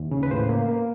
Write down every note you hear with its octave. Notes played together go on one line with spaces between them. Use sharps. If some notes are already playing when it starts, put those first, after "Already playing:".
Already playing: D#2
C#3
B4
A2 C5
A#3
A#3